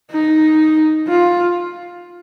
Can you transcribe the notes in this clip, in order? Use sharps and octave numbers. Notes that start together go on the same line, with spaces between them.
D#4
F4